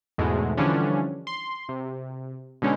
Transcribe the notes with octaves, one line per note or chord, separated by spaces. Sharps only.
E2 G#2 B2 G#3 A3
D3 E3 F3 G3 C#4 D4
C6
C3
B2 D3 G#3 C#4 D#4